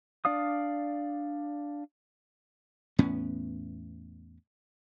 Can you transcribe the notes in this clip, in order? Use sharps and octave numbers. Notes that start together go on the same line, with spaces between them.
D4 D5 F5 D#6
E2 A2 B3 C#4